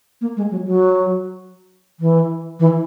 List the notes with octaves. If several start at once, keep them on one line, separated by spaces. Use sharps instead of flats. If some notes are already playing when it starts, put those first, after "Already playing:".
A#3
G#3
F#3
F#3
E3
E3